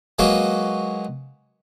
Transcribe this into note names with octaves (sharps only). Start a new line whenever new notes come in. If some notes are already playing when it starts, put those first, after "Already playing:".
F#3 G#3 A#3 F#4 B4